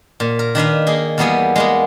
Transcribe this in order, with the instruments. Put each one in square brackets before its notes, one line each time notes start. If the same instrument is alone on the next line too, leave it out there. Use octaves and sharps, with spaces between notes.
[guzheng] A#2
A#4
D#3 D4 B4 F5
A#3 D#4 G#4
E2 G3 A#3 B3 G#4 G#5
G#3 A#3 B3